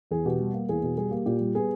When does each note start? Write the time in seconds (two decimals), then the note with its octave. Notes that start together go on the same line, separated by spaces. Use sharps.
0.11 E2 G#4
0.25 B2 G4
0.40 G3
0.54 A#3
0.69 E2 G#4
0.83 B2
0.97 G3 G#4
1.11 A#3 G4
1.26 A#2 G4
1.41 G3
1.55 B3 G#4